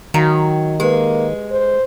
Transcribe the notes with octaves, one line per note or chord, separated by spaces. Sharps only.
D#3 F#3 F5 A#5
G#3 A#3 G4 B4
C5